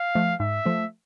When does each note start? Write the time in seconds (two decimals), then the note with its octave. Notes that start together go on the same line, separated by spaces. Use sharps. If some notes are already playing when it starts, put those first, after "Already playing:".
Already playing: F5
0.15 F3 A3
0.40 G#2 E5
0.66 F3 A3